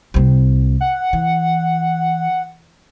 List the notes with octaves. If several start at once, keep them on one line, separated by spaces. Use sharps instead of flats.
C2 C4
F#5
E3